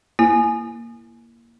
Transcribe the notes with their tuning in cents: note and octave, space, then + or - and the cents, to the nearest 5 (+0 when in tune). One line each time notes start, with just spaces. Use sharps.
A#3 +0 E4 +15 G#5 +10